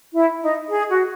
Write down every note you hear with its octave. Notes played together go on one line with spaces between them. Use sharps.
E4
D#4
G#4
F#4